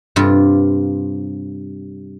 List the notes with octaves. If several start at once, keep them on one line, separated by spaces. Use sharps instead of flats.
G2 C3 F4